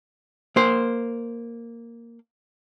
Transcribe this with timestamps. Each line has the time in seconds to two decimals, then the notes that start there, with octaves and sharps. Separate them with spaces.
0.56 A#3 C5